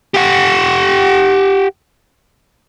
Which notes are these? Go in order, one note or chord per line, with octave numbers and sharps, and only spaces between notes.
G4 F#5